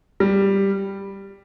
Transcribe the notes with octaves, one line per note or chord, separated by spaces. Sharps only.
G3